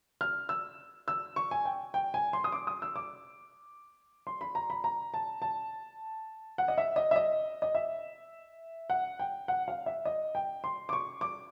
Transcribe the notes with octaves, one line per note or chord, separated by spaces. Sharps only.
F6
E6
E6
C#6
G#5
G5
G5
G#5
C6
D#6
D6
D#6
E6
D6
C6
B5
A#5
B5
A#5
A5
A5
F#5
D#5
E5
D#5
E5
D#5
D#5
E5
F#5
G5
F#5
F5
E5
D#5
G5
C6
D6
C#6
D6